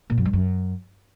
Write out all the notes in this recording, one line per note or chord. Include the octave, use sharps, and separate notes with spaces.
A#2
F#2
G2
F#2